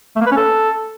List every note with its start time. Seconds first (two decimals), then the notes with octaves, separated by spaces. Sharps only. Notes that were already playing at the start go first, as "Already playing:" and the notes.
0.16 A3
0.21 A#3
0.26 B4
0.31 C#4
0.37 A4